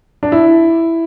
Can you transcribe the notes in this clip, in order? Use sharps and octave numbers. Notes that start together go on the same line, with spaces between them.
D4
E4